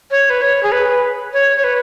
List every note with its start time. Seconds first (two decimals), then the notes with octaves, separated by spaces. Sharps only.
0.11 C#5
0.30 B4
0.42 C#5
0.63 G#4
0.72 B4
1.33 C#5
1.56 C#5
1.64 B4